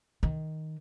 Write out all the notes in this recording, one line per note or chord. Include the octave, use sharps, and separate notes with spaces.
D#3